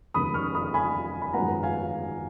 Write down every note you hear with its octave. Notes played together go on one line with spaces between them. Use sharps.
F1 D#2 C#3 G#3 B3 B5 D#6
C#6 F6
B5 D#6
G#5 B5
B5
G#1 F#2 F3 G#3 B3 F#5 A#5
F5 G#5